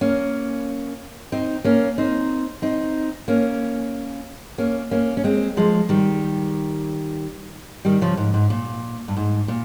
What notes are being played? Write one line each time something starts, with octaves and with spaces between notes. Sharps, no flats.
A#3 C#4
C4 D#4
A#3 C#4
C4 D#4
C4 D#4
A#3 C#4
A#3 C#4
A#3 C#4
C#4
G#3 C4
F3 G#3
D#3 G3
D#3 G3
C#3 F3
G#2
G#2
A#2
G2
G#2
A#2